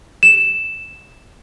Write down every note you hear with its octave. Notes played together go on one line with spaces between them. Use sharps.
E7